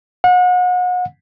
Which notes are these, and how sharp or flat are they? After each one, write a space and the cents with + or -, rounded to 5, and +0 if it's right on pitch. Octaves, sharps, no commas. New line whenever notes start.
F#5 -35